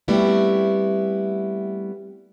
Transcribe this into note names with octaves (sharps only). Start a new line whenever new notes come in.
G3 A3 B3 C4 E4 F#4